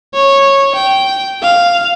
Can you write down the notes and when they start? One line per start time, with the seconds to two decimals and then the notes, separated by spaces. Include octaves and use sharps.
0.14 C#5
0.75 G5
1.42 F5